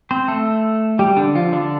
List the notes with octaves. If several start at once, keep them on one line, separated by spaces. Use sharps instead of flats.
C4 C5
A3 A4
G3 G4
D3 D4
F3 F4
D3 D4